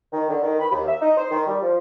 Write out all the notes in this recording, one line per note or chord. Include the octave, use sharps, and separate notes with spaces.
D#3
D3
D#3
B5
D#2
E5
D#4
C5
D#3
G3
F3